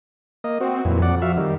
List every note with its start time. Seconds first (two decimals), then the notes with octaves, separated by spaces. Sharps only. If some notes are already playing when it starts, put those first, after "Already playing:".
0.44 A#3 D#5
0.60 C4 F#4
0.85 F2 A#2 E3 F#3
1.02 D5 F#5
1.22 F#4 E5 F5
1.37 D#3 G3